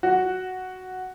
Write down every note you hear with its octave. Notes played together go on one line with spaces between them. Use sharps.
F#4